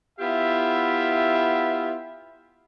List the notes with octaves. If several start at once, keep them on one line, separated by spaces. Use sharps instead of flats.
B3 E4 F4 G4 E5